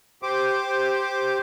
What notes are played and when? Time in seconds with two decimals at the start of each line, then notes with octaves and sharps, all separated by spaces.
0.23 G4 C5 D6